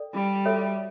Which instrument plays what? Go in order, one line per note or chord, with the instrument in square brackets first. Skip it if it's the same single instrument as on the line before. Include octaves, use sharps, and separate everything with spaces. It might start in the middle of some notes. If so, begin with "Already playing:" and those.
Already playing: [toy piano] A4 D5 G5
[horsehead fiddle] G3
[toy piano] F#4 A4 C#5 E5